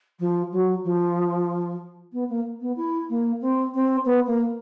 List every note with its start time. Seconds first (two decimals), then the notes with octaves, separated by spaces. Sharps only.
0.19 F3
0.52 F#3
0.84 F3
2.12 B3
2.29 A#3
2.60 B3
2.76 E4
3.09 A#3
3.41 C4
3.74 C4
4.05 B3
4.26 A#3